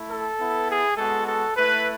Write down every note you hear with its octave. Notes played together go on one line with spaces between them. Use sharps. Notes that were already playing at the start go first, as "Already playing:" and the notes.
Already playing: A3 E4
A4
B3 E4
G#4
G#3 B3 F#4 A4
A4
A3 E4 B4